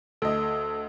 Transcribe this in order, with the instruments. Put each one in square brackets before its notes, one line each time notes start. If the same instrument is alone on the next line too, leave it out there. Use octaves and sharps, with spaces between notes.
[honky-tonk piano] D2 D#5 [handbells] A4